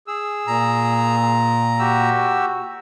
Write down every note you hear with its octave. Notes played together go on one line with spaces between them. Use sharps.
G#4 E6
A#2 A#5
F#4 G4 E6